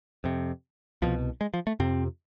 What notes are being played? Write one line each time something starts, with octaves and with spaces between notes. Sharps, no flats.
F2 C3
C2 B2 F3
G#3
F3
A3
F2 C3 C4